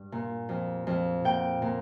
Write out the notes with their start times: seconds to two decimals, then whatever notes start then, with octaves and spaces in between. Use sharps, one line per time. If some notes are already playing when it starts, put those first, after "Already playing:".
Already playing: G2
0.12 A#2
0.49 F2
0.87 F2
1.24 A#2 G5
1.62 A#2